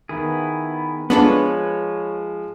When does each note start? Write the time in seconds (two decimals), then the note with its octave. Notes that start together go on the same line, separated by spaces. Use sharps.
0.09 D#3 B3 E4 G#4
1.10 F3 G#3 B3 D4 A4 B4 C#5 F#7